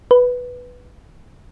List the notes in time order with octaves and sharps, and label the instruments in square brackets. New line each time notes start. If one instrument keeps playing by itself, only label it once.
[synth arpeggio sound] B4